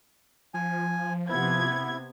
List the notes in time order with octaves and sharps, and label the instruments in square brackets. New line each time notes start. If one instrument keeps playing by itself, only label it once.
[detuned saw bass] F3 [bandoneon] G#5
[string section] C3 B3 G#6 [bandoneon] E4